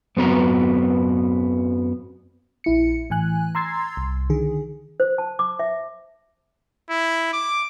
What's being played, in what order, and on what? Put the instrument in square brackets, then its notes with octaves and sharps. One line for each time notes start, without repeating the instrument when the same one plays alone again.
[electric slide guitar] F#2 B3 C4 F#4 B4 A#5
[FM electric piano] A#1 E4 C#7
A2 E3 G#5 F#6
A#5 C6 E6 G#6 A6 C7
C2
D3 D#3 G#4
[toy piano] C5
A5
D6
E5
[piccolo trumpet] E4
D6